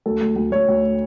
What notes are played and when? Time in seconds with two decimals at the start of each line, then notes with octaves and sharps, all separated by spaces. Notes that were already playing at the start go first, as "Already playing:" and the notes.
0.06 D2 A4
0.21 D2
0.36 D2
0.52 D2 C#5
0.68 D2